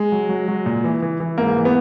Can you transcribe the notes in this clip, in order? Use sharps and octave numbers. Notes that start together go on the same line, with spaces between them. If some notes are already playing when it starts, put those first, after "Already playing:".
Already playing: G#3
F#3
F#3
F#3
A#2
E3
E3
E3
G#2 A#3
E3
B3